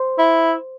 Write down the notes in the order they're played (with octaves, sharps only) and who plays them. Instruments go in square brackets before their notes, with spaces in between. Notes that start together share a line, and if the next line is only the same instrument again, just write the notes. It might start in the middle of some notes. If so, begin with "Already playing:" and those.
Already playing: [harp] C5
[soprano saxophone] E4